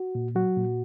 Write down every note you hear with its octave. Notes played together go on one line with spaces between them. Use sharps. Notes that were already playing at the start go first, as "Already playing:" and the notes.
Already playing: F#4
A#2
F#3 F#4
A#2